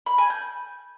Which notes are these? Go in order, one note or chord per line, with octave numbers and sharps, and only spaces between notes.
B5
G#5
G6